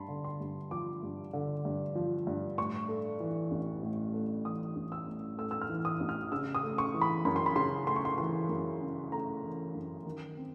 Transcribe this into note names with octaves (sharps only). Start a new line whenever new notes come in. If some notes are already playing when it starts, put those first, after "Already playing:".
Already playing: G2 A5 B5 C6
D3
C6
G2
F3 D6
G2
D3
G2
F3
G2
A2 C#6
A3
E3
A1
A2
A3
E3 D#6
A1
E6
A2
A3 E6
E6
F6
E3
D#6
A1
F6
C#3 E6
D#6
A3
C#6
E3
B5
F#2 B5
C6
B5
C#3 C6
A3 C6
C#6
C6
E3 C6
F#2
C#3
A3 A#5
E3
F#2
D#3
C4